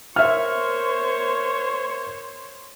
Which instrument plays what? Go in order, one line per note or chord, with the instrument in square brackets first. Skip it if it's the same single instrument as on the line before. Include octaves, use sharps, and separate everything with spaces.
[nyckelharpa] A#4 C#6 [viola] C5 C#5 [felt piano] E5 F6